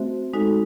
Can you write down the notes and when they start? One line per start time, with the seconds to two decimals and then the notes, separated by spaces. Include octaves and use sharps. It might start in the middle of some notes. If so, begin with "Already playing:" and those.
Already playing: A3 C4 F#4 C5 E5
0.33 G#3 D#4 F#4 A4